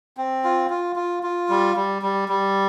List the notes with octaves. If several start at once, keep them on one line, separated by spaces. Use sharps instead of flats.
C4
F4
F4
F4
F4
G3
G3
G3
G3